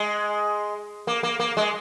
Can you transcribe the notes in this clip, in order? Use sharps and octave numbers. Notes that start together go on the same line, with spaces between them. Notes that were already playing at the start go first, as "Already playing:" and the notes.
Already playing: G#3
A#3
A#3
A#3
G#3